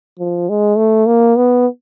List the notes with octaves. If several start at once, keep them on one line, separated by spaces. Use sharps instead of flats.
F3
G#3
A3
A#3
B3